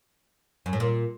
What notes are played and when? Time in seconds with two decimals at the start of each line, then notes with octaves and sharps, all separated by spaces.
0.66 F#2
0.73 A2
0.80 A#2